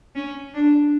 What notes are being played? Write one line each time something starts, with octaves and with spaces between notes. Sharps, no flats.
C#4
D4